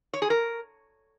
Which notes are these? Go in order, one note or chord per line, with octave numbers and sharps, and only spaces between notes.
C#5
G#4
A#4